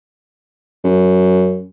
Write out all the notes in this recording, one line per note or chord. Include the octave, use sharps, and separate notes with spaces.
F#2